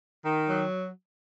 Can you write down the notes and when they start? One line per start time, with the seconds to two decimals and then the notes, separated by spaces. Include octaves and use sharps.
0.25 D#3
0.48 F#3